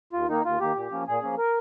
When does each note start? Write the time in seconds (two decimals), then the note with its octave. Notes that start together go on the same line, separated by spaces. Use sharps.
0.13 D#2 F4
0.28 D#3 A#3 D#4
0.45 D#2 F4
0.60 D#3 A#3 G4
0.75 A#2
0.91 F3 A#3 C#4
1.07 A#2 G#4
1.22 F3 A#3 C#4
1.38 A#4